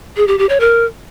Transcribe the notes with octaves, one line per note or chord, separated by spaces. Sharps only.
G#4
G4
G4
C#5
A#4